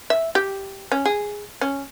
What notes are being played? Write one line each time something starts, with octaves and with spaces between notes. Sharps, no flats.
E5
G4
C#4
G#4
C#4